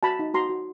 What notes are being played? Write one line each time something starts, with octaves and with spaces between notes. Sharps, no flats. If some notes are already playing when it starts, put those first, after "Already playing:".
F#4 A5 B5
D#4
F#4 A#5 C6
F#4